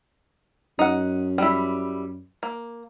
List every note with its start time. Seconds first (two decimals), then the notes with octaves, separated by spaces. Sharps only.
0.79 F#2 D#4 F#5
1.38 G3 E4
2.43 A#3